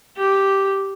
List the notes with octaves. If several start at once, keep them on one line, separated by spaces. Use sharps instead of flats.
G4